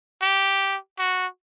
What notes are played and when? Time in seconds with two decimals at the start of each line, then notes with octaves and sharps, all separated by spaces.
0.22 G4
0.99 F#4